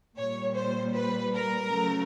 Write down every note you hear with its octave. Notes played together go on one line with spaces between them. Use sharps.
A#2 G3 C#5
C5
B4
A#4
C#3 F#3 A3